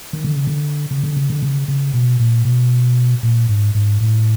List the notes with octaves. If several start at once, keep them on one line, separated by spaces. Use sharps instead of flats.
D#3
D3
C#3
D3
C#3
D3
C#3
D3
C#3
C#3
B2
A#2
B2
A#2
G#2
G#2
A2